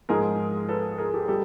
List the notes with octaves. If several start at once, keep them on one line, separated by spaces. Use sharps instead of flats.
G#2 F3 G#3 G#4 A#4
A4 B4
G#4 A#4
G4 A4
G3 G4 A4